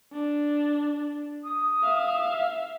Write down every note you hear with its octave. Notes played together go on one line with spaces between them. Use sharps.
D4
D#6
E5 F5